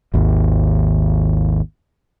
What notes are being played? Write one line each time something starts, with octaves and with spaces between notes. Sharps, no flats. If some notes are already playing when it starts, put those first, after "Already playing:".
G#1 D#2